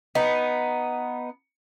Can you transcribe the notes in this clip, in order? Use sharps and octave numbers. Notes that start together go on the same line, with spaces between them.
B3 D#4